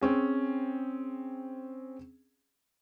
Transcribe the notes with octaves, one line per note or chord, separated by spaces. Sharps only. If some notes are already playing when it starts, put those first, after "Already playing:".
C4 C#4 G#4